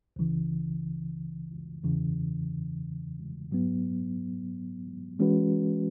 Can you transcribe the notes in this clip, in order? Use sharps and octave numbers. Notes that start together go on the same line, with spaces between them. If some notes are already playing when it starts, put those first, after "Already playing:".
C#2 C#3 E3
E2 C#3 E3
G#2 F#3 B3
E3 G#3 C#4 F#4 B4